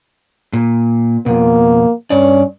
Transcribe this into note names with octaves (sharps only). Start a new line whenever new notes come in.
A#2
F2 B2 A#3
G2 C#4 D5